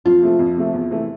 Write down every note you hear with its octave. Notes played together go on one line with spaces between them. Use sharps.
F2 F4
C3 F3 A3
F2
C3 F3 A3
E2
C3 E3 A3